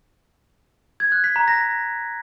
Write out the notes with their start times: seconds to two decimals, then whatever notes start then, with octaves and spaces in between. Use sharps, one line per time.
1.00 G#6
1.12 F#6
1.24 B6
1.36 A#5
1.48 A#6